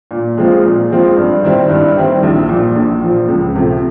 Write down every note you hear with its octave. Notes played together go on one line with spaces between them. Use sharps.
A#2
F3 G#3 C4 F4
A#2
F3 G#3 C4 F4
G2
D#3 G3 C4 E4
G2
D#3 G3 C4 E4
A#1
A#2 F3
A#1
A#2 F3
C#2
C3 F3 A3